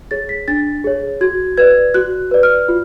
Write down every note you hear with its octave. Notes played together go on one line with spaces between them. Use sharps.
G#4 C#5 A6
B6
D4 A6
G#4 C#5
F#4 G#6
B4 D5 G#6
F#4 F#6
B4 D5
F6
F4